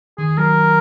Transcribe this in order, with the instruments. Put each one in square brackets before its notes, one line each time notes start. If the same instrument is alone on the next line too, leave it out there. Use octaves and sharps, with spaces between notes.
[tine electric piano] D#3 [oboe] G#4
[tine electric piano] F#3 [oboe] A#4